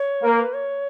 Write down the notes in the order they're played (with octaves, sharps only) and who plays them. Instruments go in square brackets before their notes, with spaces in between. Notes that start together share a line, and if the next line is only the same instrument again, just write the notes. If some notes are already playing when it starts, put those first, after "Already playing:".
Already playing: [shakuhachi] C#5
[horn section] A#3
[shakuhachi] A#4
B4
C#5